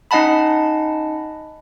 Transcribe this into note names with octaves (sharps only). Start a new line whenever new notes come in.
C#4 D#4 D#5 F#5 A5 B5